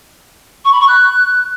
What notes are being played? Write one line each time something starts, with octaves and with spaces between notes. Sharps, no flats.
C#6
B5
C#6
F#6